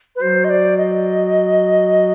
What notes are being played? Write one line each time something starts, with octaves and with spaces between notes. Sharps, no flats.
B4
F#3 C5
D#5
D5
D#5